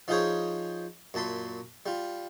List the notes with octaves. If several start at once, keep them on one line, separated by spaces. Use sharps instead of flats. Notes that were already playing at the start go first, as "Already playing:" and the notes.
F3 D#4 F4 G#4 C5 C#5
F#2 A#2 A5 B5 C6
G3 F4